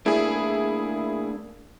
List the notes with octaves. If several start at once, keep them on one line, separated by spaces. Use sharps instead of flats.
A3 A#3 D4 E4 G#4